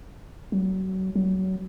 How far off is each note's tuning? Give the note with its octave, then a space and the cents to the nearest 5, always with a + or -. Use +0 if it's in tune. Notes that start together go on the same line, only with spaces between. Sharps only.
F#3 +30
F#3 +25